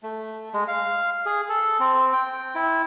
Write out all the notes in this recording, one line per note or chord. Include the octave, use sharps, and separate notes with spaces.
A3
G#3
F5
G#4
A4
C4
G5
E4